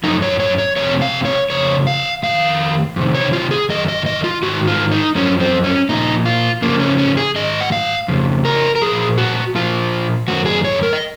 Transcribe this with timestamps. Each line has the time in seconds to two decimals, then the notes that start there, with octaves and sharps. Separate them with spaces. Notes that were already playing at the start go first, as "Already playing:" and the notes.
0.03 F#2 F3 D#4
0.22 C#5
0.40 C#5
0.58 C#5
0.76 F3 C#5
0.79 F2 C3
1.02 F5
1.25 C#5
1.50 F2 C#3 C#5
1.87 F5
2.23 F2 D#3 F5
2.96 F2 C3 D#3
3.15 C#5
3.33 F4
3.51 G#4
3.69 F#2 D#3 D#5
3.88 D#5
4.06 D#5
4.24 F4
4.42 G#2 D#3 F#4
4.67 F4
4.92 D#4
5.15 F#2 F3 C#4
5.40 C4
5.64 C#4
5.89 A#2 F3 D#4
6.25 F4
6.62 F2 C#3 F3 A#3
6.80 C#4
6.98 C#4
7.17 G#4
7.36 G#2 D#3 D#5
7.61 F#5
7.72 F5
8.08 F2 C#3
8.45 A#4
8.75 A#4
8.82 A#2 F3 G#4
9.18 F#4
9.55 A#2 F3 F4
10.28 F#2 D#3 F#4
10.46 G#4
10.65 C#5
10.83 A#4
10.93 D#5